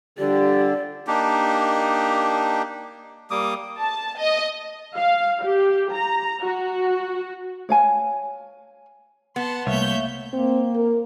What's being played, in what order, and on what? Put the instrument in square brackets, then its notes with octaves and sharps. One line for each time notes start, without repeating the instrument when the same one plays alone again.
[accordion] D3 [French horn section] F3 G3 G4 [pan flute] D5
[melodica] A#3 D4 D#4 G4
G3 A#3 D6 D#6
[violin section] A5
D#5
[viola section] F5
G4
A#5
F#4
[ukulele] C#5 F5 G#5
[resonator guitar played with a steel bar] B3 [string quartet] F#5 A5 C6
[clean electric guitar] C2 [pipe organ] A3 A#3 [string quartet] C#5 E5 G6
[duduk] A#3 [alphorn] C4
[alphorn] A#4